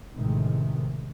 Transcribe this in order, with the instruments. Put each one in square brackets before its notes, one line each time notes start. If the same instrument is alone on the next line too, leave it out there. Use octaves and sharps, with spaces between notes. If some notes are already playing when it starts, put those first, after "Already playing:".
[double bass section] A1 A2 C3 D#3 G#3